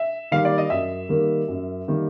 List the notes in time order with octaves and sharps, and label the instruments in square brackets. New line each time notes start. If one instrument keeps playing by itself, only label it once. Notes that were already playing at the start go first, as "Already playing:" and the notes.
Already playing: [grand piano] E5
[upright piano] D#3 G3 A#3 [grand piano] F5
[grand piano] D5
D#5
[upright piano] F#2 [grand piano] E5
[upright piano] D#3 G3 A#3
F#2
D#3 G3 A#3